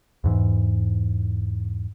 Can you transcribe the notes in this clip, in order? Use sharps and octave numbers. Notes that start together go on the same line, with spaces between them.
E2 G#2 E3